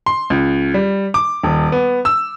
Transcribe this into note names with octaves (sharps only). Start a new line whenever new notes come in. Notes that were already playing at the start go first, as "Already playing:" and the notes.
C6
C#2
G3
D6
D#1
B3
E6